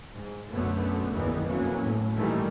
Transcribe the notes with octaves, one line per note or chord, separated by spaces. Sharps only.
G#2
B1 F#2 D3 A3 B3
F#1 B1 E2 D#3 E3 B3
F2 E3 F#3 A#3 C#4
A2
A#2 D#3 E3 G3 A3